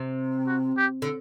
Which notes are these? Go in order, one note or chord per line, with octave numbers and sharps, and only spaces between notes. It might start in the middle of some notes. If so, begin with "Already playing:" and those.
Already playing: C3
F#4
G4
D3